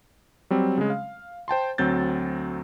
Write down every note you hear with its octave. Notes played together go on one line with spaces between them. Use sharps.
F#3 G3 C4
C#3 G#3
F5
C5 G5 A5 C6
D2 F#3 C4 G6 A6